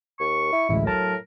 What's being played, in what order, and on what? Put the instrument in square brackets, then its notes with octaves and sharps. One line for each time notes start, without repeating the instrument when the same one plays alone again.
[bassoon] D#2 [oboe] C#6
[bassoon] E4
[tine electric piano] A1 D2 G#3 [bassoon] E4
[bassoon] A2 [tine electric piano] F#3 A5 [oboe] A#4